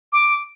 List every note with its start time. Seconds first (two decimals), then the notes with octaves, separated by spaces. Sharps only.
0.12 D6